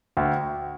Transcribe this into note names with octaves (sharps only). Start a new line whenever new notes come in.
D2 G5